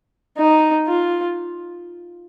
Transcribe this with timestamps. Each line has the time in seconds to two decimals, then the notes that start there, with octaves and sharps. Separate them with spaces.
0.38 D#4
0.88 F4